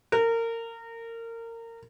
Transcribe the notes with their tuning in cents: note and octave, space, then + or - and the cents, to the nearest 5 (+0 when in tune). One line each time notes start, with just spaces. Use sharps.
A#4 -25